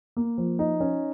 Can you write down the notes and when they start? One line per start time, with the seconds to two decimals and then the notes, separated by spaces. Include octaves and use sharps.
0.17 A#3
0.38 F3
0.59 D#4
0.80 C#4